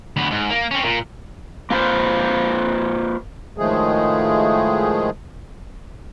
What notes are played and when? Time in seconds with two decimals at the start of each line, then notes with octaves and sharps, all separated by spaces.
0.16 D2 B3
0.31 G#2
0.50 A#3
0.71 C4 C#4
0.84 A#2
1.70 A#3 F4 B4 C5
3.58 A2 D#3 F3 G#3 A3 G#4